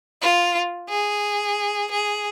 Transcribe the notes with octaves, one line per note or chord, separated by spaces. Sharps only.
F4
G#4
G#4